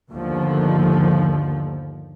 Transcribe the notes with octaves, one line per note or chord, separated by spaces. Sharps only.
G1 D#2 D3 F3